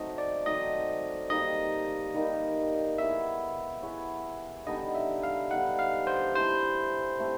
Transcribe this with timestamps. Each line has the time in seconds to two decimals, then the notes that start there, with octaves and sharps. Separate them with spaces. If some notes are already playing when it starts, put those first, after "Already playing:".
Already playing: F#3 A3 C4 D#4 D#5
0.18 D5
0.46 F#3 A3 C4 D#4 D#5
1.30 D#3 G3 A#3 D#4 D#5
2.14 D#3 G3 A#3 D#4
2.98 B3 E4 G#4 C#5 E5
3.83 B3 E4 G#4 C#5
4.67 D3 G3 B3 D#4 D#5
4.95 E5
5.23 F5
5.50 D3 G3 B3 D#4 F#5
5.79 F5
6.07 C5
6.35 A3 C4 E4 G4 C5
7.20 A3 C4 E4 G4